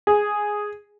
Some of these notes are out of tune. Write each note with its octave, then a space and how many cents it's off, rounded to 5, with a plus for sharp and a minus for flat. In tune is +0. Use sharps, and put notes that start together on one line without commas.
G#4 +0